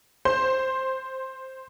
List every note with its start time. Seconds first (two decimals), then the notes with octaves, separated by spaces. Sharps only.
0.25 C5 C6